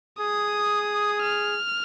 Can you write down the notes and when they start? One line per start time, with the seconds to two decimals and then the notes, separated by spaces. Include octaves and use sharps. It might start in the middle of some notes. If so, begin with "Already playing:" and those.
0.20 G#4 D#6
1.23 F6